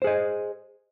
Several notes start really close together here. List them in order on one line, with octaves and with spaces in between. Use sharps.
C5 G#4 D#5